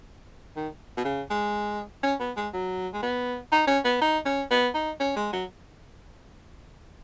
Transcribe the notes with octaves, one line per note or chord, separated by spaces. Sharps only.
D#3
B2
C#3
G#3
C#4
B3
G#3
F#3
G#3
B3
D#4
C#4
B3
D#4
C#4
B3
D#4
C#4
G#3
F#3